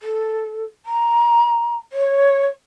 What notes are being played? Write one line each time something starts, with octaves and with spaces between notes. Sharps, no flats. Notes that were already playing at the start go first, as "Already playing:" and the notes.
A4
A#5
C#5